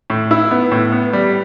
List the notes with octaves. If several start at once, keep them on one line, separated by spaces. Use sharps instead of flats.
A2
E4
B3
A2
B3
G3